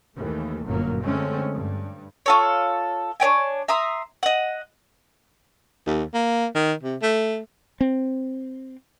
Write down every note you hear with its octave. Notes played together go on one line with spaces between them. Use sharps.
D#2 E3 A3
G1 F#2 A#2 F#3 A#3
D3 G#3 A3 C4 C#4
G2
F4 A4 C#5
D4 C#5 G5 G#5
E5 A#5 C6 D#6
D#5 F#5
D#2
A#3
D#3
C3
A3
C4